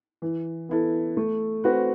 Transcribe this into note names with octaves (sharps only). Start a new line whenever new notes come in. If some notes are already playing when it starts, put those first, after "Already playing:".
E3
B3 E4 A4
A3
C4 F#4 B4